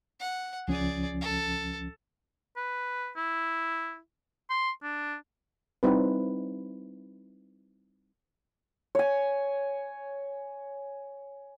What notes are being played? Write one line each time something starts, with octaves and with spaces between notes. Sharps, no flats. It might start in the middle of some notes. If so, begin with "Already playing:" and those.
F#5
C#2 F3 C#4 G#4 D5
A4
B4
E4
C6
D4
G3 C4 D#4 E4 B4
C#5 G#5